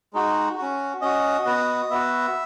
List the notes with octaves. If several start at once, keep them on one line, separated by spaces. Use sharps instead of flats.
G#3 D#4 F#4
C#4 F#4
C#4 F#4 D#5
B3 F#4
B3 F#4 E5